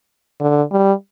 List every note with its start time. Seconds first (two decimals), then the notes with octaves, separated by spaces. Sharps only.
0.41 D3
0.71 G3